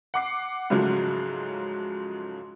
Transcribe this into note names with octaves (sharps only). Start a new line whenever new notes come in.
F#5 D6 C7
G#2 C#3 F3 F#3 G#3 A3